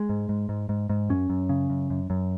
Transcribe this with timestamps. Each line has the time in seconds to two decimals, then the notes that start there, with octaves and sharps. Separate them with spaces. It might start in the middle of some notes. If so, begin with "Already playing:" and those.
Already playing: G#3
0.09 G#2
0.29 G#2
0.49 G#2
0.69 G#2
0.90 G#2
1.09 F#2 C#4
1.29 F#2
1.49 C#3
1.70 F#2
1.90 F#2
2.10 F#2